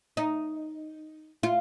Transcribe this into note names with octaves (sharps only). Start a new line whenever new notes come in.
D#4
F4